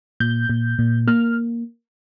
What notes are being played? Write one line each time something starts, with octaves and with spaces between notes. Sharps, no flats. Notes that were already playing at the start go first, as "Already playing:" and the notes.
A#2 G6
A#2
A#2
A#3 F6